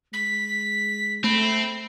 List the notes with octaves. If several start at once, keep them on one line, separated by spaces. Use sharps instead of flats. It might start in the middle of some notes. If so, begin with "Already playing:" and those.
G#3 B6
A3 C4 B5